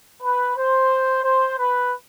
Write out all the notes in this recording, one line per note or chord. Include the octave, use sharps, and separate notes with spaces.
B4
C5
C5
B4